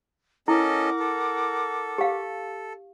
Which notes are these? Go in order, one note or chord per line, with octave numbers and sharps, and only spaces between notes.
C#4 E4 A4 A#4 D#5 F#5 D6
A4
G4 F5